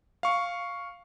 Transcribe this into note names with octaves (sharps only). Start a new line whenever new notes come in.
F5 C#6